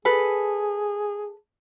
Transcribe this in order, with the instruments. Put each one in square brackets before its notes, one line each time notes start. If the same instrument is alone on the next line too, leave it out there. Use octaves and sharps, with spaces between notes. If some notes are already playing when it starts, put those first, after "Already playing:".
[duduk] G#4 [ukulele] A4 B4